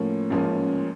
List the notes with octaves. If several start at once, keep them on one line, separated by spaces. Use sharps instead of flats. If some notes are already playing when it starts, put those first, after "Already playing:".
Already playing: A2 F3 A#3 C#4
A1 G#2 F3 A#3 C#4